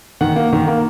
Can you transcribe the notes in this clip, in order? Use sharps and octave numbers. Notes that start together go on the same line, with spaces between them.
D#3 F#5
A#3
D#3
A#3